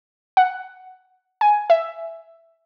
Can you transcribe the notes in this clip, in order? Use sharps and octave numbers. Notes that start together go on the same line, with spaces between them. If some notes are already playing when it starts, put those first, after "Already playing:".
F#5
G#5
E5